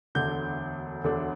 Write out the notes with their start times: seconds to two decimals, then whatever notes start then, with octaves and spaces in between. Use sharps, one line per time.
0.15 E1 D2 D3 A3 D4 G6
1.03 E1 D2 D3 A3 D4